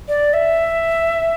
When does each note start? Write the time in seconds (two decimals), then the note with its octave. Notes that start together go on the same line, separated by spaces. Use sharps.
0.08 D5
0.33 E5